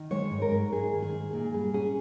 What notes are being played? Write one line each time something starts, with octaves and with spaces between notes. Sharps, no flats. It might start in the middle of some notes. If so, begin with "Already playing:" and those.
Already playing: D#3
G#3 C#5
G#2
A#4
G#2
G#3 G#4
D#3
G#4
G#2
A#2 G#4
G3 G#4
C#4 G#4